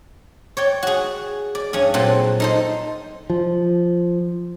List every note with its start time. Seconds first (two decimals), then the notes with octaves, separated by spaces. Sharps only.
0.57 C#5 D5 G5
0.83 F#4 G#4
1.55 D5
1.73 G2 C#4 G#4
1.94 A#2 F#3 C4 A4
2.40 D#4 A4 C5
3.30 F3